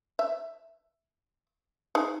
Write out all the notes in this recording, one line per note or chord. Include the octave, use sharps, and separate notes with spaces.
E5
D#4 G#4